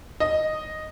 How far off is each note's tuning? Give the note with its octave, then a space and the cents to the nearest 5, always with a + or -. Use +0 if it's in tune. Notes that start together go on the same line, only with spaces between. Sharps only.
D#5 -5